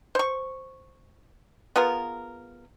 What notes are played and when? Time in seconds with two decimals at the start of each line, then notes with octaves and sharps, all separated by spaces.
0.15 C5 C#6
1.76 B3 F4 G#4 A#4